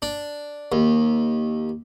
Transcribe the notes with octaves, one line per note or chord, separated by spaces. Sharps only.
D4
D#2